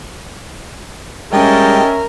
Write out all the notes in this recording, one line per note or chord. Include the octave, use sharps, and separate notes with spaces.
G3 G#3 C#4 A#4 D#5 E5 G5 A5